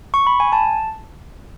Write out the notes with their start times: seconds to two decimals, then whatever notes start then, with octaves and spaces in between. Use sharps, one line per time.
0.14 C#6
0.27 B5
0.40 G#5
0.52 A5